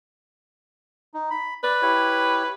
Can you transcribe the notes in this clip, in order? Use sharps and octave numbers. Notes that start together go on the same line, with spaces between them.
D#4
B5
B4 D5
E4 G4 C#5